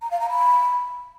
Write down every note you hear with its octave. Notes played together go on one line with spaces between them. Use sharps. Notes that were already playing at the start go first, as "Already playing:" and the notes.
A#5
F5
A#5
B5